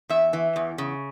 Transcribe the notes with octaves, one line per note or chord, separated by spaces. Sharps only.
E2 E5
E3
E2
C#3